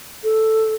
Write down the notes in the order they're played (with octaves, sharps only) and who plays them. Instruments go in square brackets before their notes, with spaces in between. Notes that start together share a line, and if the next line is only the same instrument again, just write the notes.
[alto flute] A4